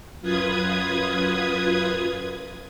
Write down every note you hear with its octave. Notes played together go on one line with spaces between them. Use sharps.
F#2 F4 B4 D#6 G#6